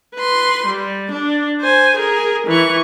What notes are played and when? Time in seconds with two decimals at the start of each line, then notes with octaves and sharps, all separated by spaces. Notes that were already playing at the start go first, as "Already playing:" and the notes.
0.15 B4 C6
0.66 G3
1.11 D4
1.61 C5 G#5
1.96 G#4 A#4
2.47 E3 C#6